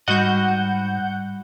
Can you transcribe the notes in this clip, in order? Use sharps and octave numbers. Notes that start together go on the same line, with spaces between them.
G#2 G3 F#4 D#5 F#5 G6